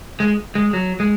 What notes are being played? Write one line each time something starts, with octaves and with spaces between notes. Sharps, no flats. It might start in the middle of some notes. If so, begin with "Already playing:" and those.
G#3
G#3
F#3
G#3